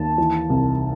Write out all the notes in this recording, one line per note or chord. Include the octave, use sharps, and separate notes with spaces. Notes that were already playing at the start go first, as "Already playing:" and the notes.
Already playing: D#2 A5
E3
C2